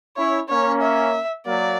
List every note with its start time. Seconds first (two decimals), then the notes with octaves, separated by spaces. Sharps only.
0.17 C#4 E4 C#5
0.49 A#3 C#4 C#5
0.82 E5
1.46 F#3 A#3 D5